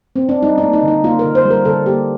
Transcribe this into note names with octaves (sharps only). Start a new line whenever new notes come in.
C4
D4
G3 D#4
D4
A#3
D#4
D3
D#4
A#3 F4
A#4
D3
C5
G3
A#4
D3 A4
A#3 G4